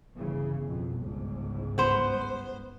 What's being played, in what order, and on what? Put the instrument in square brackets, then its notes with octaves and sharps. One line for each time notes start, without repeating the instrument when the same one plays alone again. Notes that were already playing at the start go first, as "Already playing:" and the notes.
[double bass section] G1 C#3 E3
F2 B2
G1 C#2 G#2
[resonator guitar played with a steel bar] B3 C5